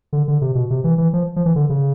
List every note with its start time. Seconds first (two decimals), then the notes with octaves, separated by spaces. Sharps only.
0.13 D3
0.28 D3
0.41 C3
0.55 B2
0.70 C3
0.84 E3
0.98 E3
1.13 F3
1.36 F3
1.46 E3
1.56 D3
1.70 C#3